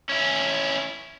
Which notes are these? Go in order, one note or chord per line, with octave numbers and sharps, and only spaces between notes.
C#4 E4